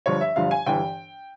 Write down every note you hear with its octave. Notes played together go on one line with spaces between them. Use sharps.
G1 G2 F3 C#5
E5
G1 G2 F3 F5
G#5
G1 G2 E3 G5